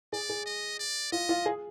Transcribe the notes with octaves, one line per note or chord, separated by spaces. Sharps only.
G#4 D5
G#4
D#5
D5
F4 D#5
F4
G#4